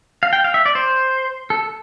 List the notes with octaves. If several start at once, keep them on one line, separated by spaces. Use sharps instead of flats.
F5
G5
F5
E5
D5
C5
A4